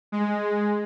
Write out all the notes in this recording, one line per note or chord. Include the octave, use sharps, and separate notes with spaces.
G#3